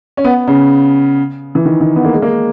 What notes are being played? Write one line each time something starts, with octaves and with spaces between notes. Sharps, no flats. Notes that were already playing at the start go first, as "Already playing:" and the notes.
C#4
B3
C#3
E3
D#3
D#3
B3
A#3
G#3
A#3